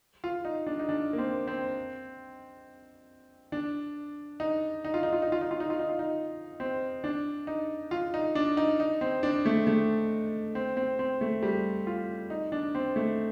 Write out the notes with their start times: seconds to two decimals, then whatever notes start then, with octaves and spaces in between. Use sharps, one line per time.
0.24 F4
0.45 D#4
0.67 D4
0.79 D#4
0.89 D4
1.13 A#3
1.18 C4
1.47 C4
3.52 D4
4.40 D#4
4.85 D#4
4.94 F4
5.03 D#4
5.13 F4
5.22 D#4
5.32 F4
5.41 D#4
5.51 F4
5.60 D#4
5.70 F4
5.79 D#4
5.89 F4
5.99 D#4
6.60 C4
7.04 D4
7.47 D#4
7.91 F4
8.14 D#4
8.35 D4
8.57 D#4
8.80 D#4
9.01 C4
9.23 D4
9.46 A3
9.67 A3
10.55 C4
10.77 C4
10.99 C4
11.21 A3
11.43 G3
11.87 F4
12.30 D#4
12.52 D4
12.75 C4
12.96 A3